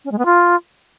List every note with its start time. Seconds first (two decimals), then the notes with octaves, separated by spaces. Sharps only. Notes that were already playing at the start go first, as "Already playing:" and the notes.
0.05 C#4
0.12 G#3
0.19 B3
0.25 F4